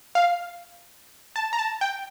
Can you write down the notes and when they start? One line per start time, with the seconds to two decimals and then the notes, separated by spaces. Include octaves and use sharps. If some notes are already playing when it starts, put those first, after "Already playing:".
0.15 F5
1.36 A5
1.53 A#5
1.59 A5
1.81 G5